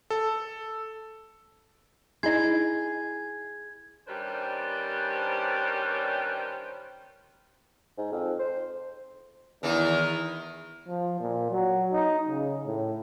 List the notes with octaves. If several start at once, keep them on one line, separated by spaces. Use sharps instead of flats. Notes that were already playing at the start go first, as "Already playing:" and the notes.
A4
D#4 E4 G#4 C6 G#6
D#3 G3 C#4 D4 B4 C5
G#2
F2
C5
E2 D#3 E3
F3
A#2
F#3
D#4
C#3
A2